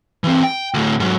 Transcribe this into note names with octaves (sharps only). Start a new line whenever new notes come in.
E3 C4
G5
D2 A2
G#2 F#3